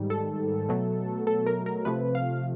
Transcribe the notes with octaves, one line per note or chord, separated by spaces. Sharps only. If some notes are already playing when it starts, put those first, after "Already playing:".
Already playing: G#2 D#3 G3
A4
B2 F#3 A3
A4
A#4
A#4
C3 F3 A3 B4
F5